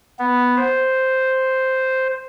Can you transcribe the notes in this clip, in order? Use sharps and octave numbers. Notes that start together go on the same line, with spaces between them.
B3
C5